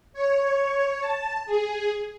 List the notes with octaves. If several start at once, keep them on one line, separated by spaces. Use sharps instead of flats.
C#5
A5
G#4